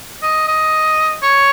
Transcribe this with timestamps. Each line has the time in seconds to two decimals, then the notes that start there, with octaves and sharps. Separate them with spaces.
0.22 D#5
0.47 D#5
1.23 C#5